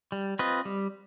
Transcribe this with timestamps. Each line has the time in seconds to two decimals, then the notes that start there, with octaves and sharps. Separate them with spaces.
0.12 G3
0.39 C4 F4 B4 D#5
0.65 G3